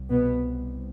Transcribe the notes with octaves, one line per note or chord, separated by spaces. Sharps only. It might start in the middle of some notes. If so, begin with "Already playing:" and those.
Already playing: C2
B2 B3